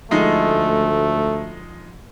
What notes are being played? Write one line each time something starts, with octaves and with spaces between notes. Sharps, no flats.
D2 F3 G#3 A3 D#4